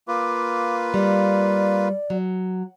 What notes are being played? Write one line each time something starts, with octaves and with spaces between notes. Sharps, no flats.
A#3 F4 B4 D6
G3 D5
F#3